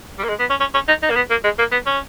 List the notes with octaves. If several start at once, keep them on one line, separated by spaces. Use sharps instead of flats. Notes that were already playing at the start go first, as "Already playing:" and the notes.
G3
A#3
G#3
B3
C#4
C#4
C#4
D#4
D#4
A#3
B3
A#3
G#3
A#3
B3
C#4